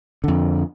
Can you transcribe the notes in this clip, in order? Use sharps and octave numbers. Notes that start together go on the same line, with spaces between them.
F2 D3